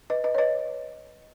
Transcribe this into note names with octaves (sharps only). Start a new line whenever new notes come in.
B4 D#5
B4 D#5
C#5
B4 D#5